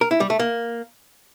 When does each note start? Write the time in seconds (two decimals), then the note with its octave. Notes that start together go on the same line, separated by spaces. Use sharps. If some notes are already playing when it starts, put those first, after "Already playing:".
0.01 A#4
0.11 E4
0.20 G3
0.30 A3
0.39 A#3